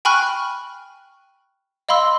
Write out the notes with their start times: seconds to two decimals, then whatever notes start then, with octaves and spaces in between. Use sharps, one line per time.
0.05 G5 G#5 B5 C#6 F6 F#6
1.89 D#5 F5 B5 C6 E6